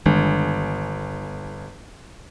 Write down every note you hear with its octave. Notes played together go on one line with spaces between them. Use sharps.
G1 D#3 G#3 D4